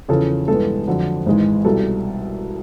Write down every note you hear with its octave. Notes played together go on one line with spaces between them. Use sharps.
E2 C#3 F3 A4
G2 E3 G#3 B3 A4
F2 D3 F#3
G#1 G#2 E3 G#3
C2 B2 G3 A4